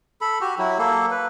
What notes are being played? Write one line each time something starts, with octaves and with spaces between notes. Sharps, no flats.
A4 B5
F#4 G4
F#3 E4
A#3 A4
B4